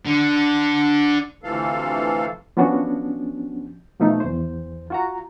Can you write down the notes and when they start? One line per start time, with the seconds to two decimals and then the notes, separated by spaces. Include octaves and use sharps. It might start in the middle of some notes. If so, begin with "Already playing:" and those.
0.05 D3
1.43 D2 C3 E3 F3 A4 F5
2.57 F3 B3 C#4 D4 F#4
4.00 B2 F3 A3 D#4
4.20 E2 C5
4.90 F4 F#4 A#5